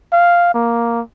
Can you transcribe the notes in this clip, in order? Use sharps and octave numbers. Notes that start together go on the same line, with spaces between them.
F5
A#3